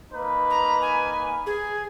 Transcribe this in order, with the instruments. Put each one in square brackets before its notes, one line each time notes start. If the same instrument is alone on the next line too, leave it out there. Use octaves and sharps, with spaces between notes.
[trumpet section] A#3 D#4 B4
[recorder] A#5
G#5
G#4